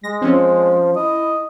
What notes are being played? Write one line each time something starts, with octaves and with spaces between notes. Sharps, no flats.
G#3 A#6
F3 C4 C#4
E4 D#5